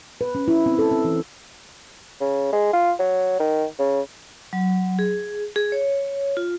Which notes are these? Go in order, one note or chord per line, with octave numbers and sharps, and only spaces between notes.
B4
C#4
E4
C4
A4
C4
E3
C#3
G#3
F4
F#3
D#3
C#3
F#3
G#4
G#4
C#5
F4